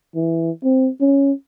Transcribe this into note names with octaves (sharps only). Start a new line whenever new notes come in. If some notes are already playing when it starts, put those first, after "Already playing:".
E3
C4
C#4